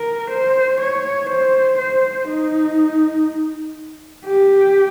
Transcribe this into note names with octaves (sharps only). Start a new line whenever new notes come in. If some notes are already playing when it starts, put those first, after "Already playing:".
Already playing: A#4
C5
C#5
C5
C5
D#4
G4